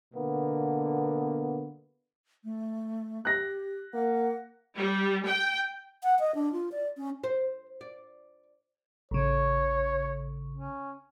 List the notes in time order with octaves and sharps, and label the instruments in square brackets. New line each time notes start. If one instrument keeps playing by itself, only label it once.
[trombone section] B2 D3 A#3 B3
[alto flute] A3
[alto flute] G4 [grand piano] F#6 A#6
[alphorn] A#3 [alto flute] F#5
[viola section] G3
G5
[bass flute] F#5
D#5
D4
F4
D5
C#4
[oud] C5
D5
[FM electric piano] A1 C#3 [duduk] C#5
[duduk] C#4